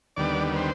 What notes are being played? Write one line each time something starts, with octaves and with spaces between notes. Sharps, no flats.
D#2 D3 G3 B3 D5
C5